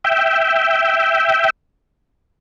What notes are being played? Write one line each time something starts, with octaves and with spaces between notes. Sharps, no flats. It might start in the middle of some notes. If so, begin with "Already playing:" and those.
E5 G5